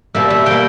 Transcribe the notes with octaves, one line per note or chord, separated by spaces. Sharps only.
B2 G3 A#3 E5
E5
B2 G3 A#3 G5